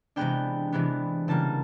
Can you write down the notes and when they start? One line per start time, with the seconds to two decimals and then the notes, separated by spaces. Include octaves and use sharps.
0.16 C3 E3 G#3 B3 D4 G5
0.72 C3 E3 G#3 B3 D4
1.28 C#3 E3 G3 A#3 A5